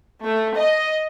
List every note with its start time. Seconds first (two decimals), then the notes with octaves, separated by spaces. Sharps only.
0.22 A3
0.56 D#5